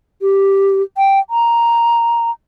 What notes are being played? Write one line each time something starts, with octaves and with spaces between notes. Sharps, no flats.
G4
G5
A#5